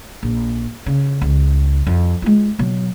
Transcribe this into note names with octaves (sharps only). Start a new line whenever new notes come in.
A#1
C#3
C#2
F2
G#3 F4
B2 F#3